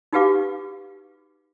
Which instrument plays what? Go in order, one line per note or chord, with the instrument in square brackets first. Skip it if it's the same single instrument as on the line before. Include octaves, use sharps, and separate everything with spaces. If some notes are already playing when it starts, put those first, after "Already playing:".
[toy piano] D#4 F#4 G4 B4 F5 D6